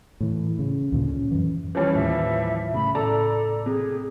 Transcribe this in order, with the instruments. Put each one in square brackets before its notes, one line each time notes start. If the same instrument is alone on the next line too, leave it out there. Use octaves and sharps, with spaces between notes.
[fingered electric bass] A2 E3
C#3
D2 A#2 D3
C#4
F#2 E3
[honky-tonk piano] E3 F3 G3 [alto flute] C#4
[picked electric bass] D#2 A2 [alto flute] E5
[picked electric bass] A2 C#3 [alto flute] B5
[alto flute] A4 [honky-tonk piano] D5 A5 A#5
[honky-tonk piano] C3 [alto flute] G#4